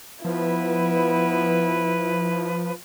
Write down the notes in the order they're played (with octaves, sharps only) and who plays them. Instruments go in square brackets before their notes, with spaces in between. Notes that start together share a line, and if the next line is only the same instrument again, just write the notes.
[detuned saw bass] F3 [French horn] B3 [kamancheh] E4 [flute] B4